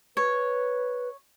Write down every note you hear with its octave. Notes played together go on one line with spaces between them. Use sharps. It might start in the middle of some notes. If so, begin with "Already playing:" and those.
B4 C#5